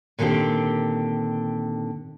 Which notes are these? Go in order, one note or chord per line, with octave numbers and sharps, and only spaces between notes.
A#2 D3 D#3 C4 G4